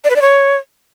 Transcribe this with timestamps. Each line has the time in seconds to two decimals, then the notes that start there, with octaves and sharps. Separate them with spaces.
0.04 D5
0.10 B4
0.16 D5
0.22 C#5